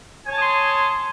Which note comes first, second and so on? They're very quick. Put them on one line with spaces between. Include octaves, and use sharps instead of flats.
G#5 C#5 A5 D#6 C6